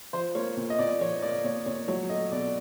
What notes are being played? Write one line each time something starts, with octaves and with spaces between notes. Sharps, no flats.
F3 C5
A#3 C#5
A#2
D#5
A#2 D5
F3 C#5
A#3 D5
A#2 C#5
A#2 C#5
F#3 C#5
A3 D#5
B2 D5